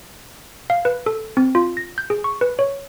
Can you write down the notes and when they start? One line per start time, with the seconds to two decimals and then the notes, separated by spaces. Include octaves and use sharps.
0.70 F5
0.85 B4
1.06 A4
1.37 C4
1.55 F4
1.77 A#6
1.98 G6
2.10 G#4
2.24 C#6
2.41 B4
2.59 C#5